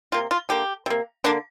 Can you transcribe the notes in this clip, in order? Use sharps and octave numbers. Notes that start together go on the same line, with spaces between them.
C3 A#3 F4
F4
D3 A#3 G4
C3 A#3
D3 A#3 D4